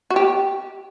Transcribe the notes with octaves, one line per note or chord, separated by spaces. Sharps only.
F#4
G4